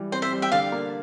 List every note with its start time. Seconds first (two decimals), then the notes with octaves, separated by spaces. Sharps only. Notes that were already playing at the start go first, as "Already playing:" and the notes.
Already playing: E3 G3
0.12 C4 C5
0.22 C5 E5
0.32 G3
0.42 E5 G5
0.52 D3 D5 F5
0.72 A#3